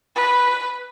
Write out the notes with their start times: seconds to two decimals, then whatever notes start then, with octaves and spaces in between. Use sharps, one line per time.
0.16 B4